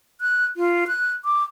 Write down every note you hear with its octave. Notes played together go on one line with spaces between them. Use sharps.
F#6
F4
F#6
D6